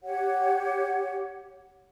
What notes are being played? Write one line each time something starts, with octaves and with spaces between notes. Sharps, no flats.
G4 C#5 F#5